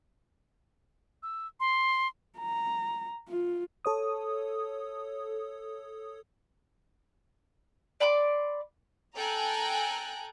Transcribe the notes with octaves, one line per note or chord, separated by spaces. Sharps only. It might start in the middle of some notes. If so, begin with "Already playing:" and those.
E6
C6
A#5
F4
A4 C#5 D#6
D5 B5 C6 D6
A4 G5 G#5 A#5 F#6